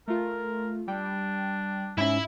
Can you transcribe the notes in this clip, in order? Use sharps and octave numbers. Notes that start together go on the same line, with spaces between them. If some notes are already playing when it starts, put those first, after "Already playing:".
A3 F4 A#4
G3 D4 G5
G#2 C#4 E4 E5